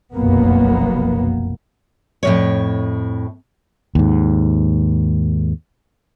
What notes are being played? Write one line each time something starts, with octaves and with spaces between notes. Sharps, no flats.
F1 B1 F#2 A#3 B3
F2 A2 C#5
D#2 G#2